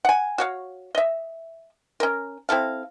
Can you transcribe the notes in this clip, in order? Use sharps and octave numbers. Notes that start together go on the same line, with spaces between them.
F#5 G#5
F#4 C#5 F5
D#5 E5
C#4 A#4
C4 E4 A4 F5